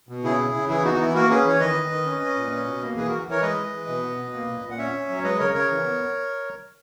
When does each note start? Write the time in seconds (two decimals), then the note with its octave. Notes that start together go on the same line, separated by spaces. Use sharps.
0.09 B2
0.24 C#3 E4 G#4
0.39 C#3
0.54 C#3
0.69 E3 E4 G#4
0.84 B3 D#4 F#4
0.94 F#4
1.00 E3 E4
1.15 A#3 F#4 A#4
1.29 C#4 G#4 B4
1.45 E3 C#5
1.60 D#3 B4 D#5
1.75 D#3
1.91 D#3
2.06 C#4
2.21 C#4
2.36 A#2
2.51 C#4
2.66 B2
2.81 A#3
2.96 E3 G#4 B4
3.08 E3 F#4 A#4
3.27 E3 A#4 C#5
3.42 G#3 B4 D#5
3.58 G#3
3.73 E3
3.88 B2
4.03 B3
4.17 B2
4.33 A#3
4.48 A#2
4.63 A#2
4.71 F#5
4.78 C#4 C#5 E5
4.93 C#4
5.09 F#3
5.17 C#5
5.23 G#3 B4 D#5
5.39 C#3 A#4 C#5
5.54 C#3 A#4 C#5
5.70 E3
5.85 B3